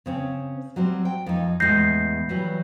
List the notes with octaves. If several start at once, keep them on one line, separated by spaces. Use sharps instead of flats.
C#3 C4 C#4
F#3 G3 C4
G5
F2 D#4
E2 A2 G#3 G6 A#6 C7
E3 F#3 G3